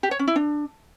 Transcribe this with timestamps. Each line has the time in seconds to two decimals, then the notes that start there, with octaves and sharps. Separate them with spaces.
0.03 G4
0.11 C#5
0.19 C#4
0.28 E4
0.36 D4